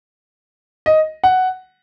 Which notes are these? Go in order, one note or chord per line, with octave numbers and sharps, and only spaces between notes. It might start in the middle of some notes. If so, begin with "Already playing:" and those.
D#5
F#5